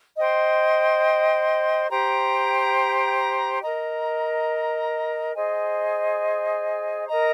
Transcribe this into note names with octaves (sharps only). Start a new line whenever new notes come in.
C5 D#5 G5 C6
G4 C5 G5 A#5
A#4 D#5 A#5
G#4 C5 D#5 G#5
A#4 D#5 A#5